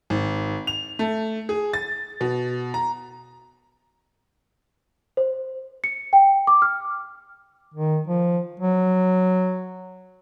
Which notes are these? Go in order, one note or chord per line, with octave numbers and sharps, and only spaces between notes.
G#1
F7
A3
G#4
A6
B2
A#5
C5
C#7
G5
D6
F6
D#3
F3
F#3